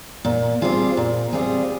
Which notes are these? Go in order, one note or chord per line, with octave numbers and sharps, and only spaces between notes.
A#2
G3 C4 F4 G#4
A#2
G3 C4 F4 G#4